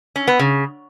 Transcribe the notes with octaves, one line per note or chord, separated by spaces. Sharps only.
C#4
B3
C#3